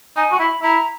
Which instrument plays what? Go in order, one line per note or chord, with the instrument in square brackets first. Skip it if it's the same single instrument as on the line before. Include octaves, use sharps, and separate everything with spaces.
[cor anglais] D#4 [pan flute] G#5
[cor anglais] F#4
[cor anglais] E4 [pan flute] B5
[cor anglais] E4 [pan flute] A#5